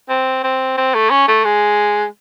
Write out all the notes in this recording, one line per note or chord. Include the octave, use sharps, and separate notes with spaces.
C4
C4
C4
A3
C#4
A3
G#3